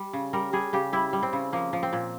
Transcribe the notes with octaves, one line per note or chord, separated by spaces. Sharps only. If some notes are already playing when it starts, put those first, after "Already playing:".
Already playing: G3
C#3
G3 A#4
G3 G#4
C#3 G4
G3 E4
G3
C4
C#3
F3 A#3
F3
C4
A#2